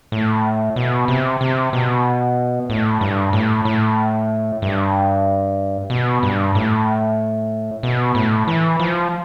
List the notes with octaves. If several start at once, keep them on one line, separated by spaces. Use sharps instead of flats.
A2
B2
C3
C3
B2
A2
G2
A2
A2
G2
B2
G2
A2
B2
A2
E3
F3